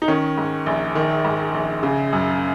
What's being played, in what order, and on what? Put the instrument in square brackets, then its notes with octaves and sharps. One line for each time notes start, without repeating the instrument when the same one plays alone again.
[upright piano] D#4
D#3 C#4
G#2
A#1
D#3
G#2
A#1
C#3
F#2